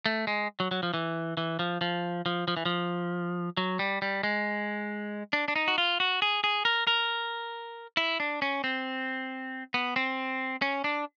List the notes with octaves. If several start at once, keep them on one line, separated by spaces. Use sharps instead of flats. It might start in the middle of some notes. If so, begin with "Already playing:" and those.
A3
G#3
F#3
F#3
F3
E3
E3
F3
F3
F3
F3
E3
F3
F#3
G3
G3
G#3
D4
D4
D#4
F#4
F4
F#4
G#4
G#4
A#4
A#4
E4
D4
C#4
C4
B3
C4
C#4
D4